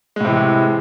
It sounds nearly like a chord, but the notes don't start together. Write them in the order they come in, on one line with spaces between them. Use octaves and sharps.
G#3 A2 C3 E3